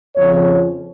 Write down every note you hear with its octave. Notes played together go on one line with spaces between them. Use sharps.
F2 C#3 F3 C#5